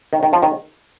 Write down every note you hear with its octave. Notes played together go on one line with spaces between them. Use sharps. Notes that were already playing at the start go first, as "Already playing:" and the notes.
D#3
D#3
F3
D#3